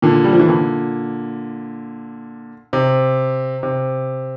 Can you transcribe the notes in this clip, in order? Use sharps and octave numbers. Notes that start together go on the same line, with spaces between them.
A#2 D3
G3
F3
E3
A#2 D3
C3
C3